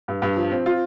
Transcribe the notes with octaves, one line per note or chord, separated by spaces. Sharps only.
G2
G2
F3
C4
F4